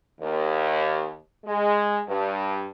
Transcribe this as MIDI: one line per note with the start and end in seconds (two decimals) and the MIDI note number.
0.20 1.16 39
1.45 1.99 56
2.07 2.65 43